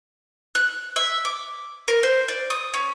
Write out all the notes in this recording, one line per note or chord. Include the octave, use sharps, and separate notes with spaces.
F#6
E5
D6
A#4
C5
D5
D#6
C#4